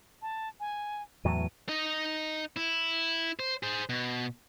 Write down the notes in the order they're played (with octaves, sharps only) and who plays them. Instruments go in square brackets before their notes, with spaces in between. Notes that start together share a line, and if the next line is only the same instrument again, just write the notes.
[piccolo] A5
G#5
[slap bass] E2 A2 F#3 [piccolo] D#7
[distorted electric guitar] D#4 D#5
E4
C5
G#4 C5
B2